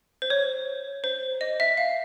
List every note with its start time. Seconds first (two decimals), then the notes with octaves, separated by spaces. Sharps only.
0.22 C5
0.30 C#5
1.04 C5
1.41 D#5
1.60 E5
1.77 F5